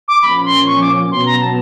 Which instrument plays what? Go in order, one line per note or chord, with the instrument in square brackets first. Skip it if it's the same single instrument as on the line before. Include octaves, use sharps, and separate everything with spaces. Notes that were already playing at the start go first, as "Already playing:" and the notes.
[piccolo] D6
[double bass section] A#2 F3 A#3 C#4 [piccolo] B5
[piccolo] C6
C#6
D6
[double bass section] B2 F#3 B3 [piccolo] C6
[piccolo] A#5
A5